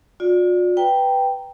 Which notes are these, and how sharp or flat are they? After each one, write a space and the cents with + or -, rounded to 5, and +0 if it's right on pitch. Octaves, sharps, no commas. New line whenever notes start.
F4 +45 D5 +0
B4 +0 G5 +0 A#5 +0